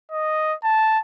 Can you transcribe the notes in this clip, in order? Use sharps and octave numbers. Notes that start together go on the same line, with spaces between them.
D#5
A5